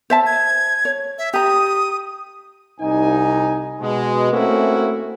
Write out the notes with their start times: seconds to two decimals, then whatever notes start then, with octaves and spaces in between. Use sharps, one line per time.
0.10 C5 E5 A5
0.26 G#6
0.85 C#5
1.18 E5
1.34 G4 A#5 D#6
2.81 C2 D#4 G#5
3.81 B2 G#3
4.33 A3 A#3 C4 C#4 E4 F#4